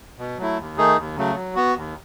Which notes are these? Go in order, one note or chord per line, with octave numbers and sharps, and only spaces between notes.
B2
F#3 A3 E4
D#2
D#3 A3 D#4 G#4
D#2
C#3 F#3 A3
F#3
B3 F#4
D#2